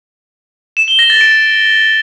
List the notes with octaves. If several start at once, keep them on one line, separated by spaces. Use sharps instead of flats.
E7
G7
A#6
A6
D7